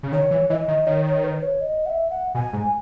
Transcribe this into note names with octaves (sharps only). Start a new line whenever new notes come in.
C#3
D#3 C#5
E3
E3 D#5
D#3
D#3 C#5
C#5
B4
C#5
D#5
F#5
E5
F#5
B2 G#5
G#2